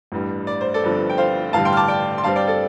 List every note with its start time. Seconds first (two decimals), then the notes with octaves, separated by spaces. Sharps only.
0.12 A1 G2 G3
0.47 D5
0.61 C5
0.74 A4 D5
0.83 G1 G2 F3 C4
1.10 G5
1.18 C5 F5
1.53 A1 G2 D3 G3 F5 A5
1.65 G5 C6
1.73 F6
1.77 A5 D6
1.88 D5 G5
2.18 C6
2.24 G2 G3 C4 F5 A5
2.36 D5 G5
2.47 A4 D5